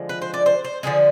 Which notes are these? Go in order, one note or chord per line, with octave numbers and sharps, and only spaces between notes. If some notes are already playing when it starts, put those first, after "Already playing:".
Already playing: D3 F3 G#3
B4
C5
D5
C5
C5
D3 F3 G#3 G#4